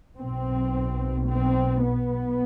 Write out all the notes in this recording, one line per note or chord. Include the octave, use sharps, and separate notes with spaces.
B1 B2 C4
C4
B3